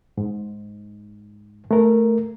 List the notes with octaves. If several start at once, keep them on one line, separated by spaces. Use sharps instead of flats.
G#2
A3 A#4